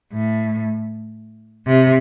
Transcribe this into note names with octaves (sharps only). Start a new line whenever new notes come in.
A2
C3